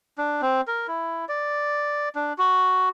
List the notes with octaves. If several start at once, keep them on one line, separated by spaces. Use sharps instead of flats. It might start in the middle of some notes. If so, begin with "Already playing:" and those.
D4
C4
A#4
E4
D5
D4
F#4